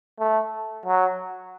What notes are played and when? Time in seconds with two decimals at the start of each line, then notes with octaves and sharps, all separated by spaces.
0.20 A3
0.86 F#3